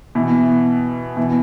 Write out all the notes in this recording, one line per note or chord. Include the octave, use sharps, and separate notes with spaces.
B2 E3
B2 E3